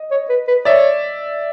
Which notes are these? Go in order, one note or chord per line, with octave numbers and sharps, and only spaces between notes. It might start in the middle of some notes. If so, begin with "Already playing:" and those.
Already playing: D#5
C#5
B4
B4
C#5 D5 E5